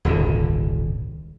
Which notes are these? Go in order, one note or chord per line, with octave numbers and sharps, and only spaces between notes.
D#1 G#1 C#2 D3